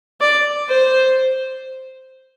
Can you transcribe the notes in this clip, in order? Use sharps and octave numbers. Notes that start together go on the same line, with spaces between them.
D5
C5